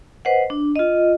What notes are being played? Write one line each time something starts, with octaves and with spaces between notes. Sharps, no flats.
B4 C5 D#5 F#5
D4
F4 D#5